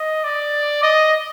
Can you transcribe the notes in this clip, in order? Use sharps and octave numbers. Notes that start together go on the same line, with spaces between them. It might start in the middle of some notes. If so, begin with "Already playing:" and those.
Already playing: D#5
D5
D#5